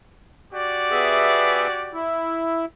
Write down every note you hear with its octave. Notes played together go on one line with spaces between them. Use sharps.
F#4 G4 D5
B3 G#4 E5
E4